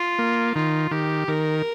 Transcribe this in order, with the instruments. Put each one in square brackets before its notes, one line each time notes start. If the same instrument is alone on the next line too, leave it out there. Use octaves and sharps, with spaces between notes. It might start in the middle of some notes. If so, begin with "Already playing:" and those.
Already playing: [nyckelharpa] F4
[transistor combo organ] A#3
[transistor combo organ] D#3 [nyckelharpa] F4
[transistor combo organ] D#3 [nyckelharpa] G4
[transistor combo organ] D#3 [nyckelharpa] A#4